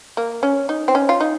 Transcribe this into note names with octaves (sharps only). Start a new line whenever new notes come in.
A#3
C#4
D#4
C4
C#4
F4
D#4